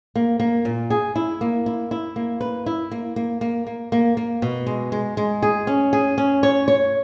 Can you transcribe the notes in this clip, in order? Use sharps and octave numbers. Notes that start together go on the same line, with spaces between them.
A#3
A#3
A#2
G#4
E4
A#3
E4
E4
A#3
B4
E4
A#3
A#3
A#3
A#3
A#3
A#3
B2
G#3
G#3
G#3
G#4
C#4
G#4
C#4
C#5
C#5